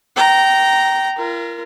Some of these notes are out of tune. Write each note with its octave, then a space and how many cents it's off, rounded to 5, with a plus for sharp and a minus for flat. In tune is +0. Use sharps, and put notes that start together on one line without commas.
G5 -20 A#5 +0
F4 -40 A#4 +0